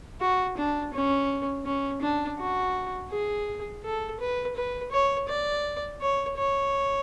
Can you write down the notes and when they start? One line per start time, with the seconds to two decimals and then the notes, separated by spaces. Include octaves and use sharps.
0.21 F#4
0.57 D4
0.93 C#4
1.65 C#4
2.01 D4
2.39 F#4
3.10 G#4
3.84 A4
4.20 B4
4.56 B4
4.91 C#5
5.28 D5
6.01 C#5
6.37 C#5